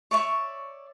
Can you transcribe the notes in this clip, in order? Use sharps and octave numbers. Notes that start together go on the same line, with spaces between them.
C#5 D5 E5 C#6